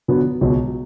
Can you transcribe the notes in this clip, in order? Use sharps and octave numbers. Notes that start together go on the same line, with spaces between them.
D3 F#3 B3 F#4
C#2 B2 F#3